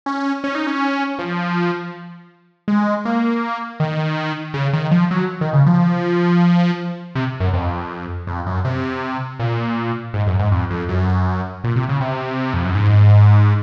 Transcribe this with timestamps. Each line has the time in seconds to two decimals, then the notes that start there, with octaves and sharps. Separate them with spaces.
0.06 C#4
0.44 C#4
0.55 D#4
0.67 C#4
1.19 F3
2.68 G#3
3.05 A#3
3.80 D#3
4.54 C#3
4.73 D#3
4.91 F3
5.11 F#3
5.41 D#3
5.53 C#3
5.66 F3
7.15 C3
7.40 F#2
7.53 F2
8.27 F2
8.46 F#2
8.65 C3
9.39 A#2
10.14 G#2
10.27 F#2
10.39 G#2
10.51 F2
10.70 F2
10.89 F#2
11.64 A#2
11.76 C3
11.89 C#3
12.01 C3
12.54 F2
12.65 F#2
12.75 G#2